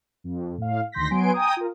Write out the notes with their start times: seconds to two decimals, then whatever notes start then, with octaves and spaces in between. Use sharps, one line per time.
0.24 F2
0.58 A2 F5
0.92 D2 D#3 C6 G6 A#6 B6
1.10 F#3 B3 G#5 C6 D7
1.34 G5 G#5 A#5 D#6
1.57 F4 A#4